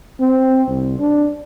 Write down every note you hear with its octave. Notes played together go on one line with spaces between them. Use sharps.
C4
C2
D4